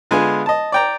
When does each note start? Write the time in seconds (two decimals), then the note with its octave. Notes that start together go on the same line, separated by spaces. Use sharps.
0.11 D3 G#3 B3 F4 G#5
0.46 D#5 A5
0.72 D5 G5 A#5